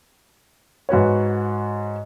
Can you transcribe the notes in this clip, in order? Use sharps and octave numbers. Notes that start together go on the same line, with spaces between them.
G#2 F#4 B4 C#5